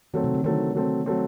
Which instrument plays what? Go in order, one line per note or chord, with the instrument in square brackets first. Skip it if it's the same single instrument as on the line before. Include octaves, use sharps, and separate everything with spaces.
[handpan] D#3 [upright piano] F#3 A3 C4
[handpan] C3
D3
[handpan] D#3 [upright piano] F#3 A3 C4
[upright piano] F#3 A3 C4
F#3 A3 C4